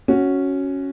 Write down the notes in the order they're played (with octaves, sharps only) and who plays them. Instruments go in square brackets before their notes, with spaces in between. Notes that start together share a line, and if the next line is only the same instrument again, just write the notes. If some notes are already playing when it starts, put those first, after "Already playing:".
[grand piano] C#4 F#4